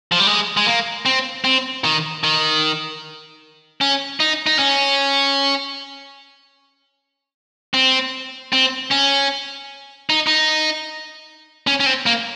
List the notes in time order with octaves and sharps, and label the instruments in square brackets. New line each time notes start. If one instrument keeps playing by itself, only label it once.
[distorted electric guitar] F3
G3
G#3
G#3
A#3
C4
C4
D#3
D#3
C#4
D#4
D#4
C#4
C4
C4
C#4
D#4
D#4
C#4
C#4
C4
A#3